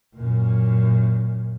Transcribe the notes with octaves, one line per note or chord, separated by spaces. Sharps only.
F#2 A#2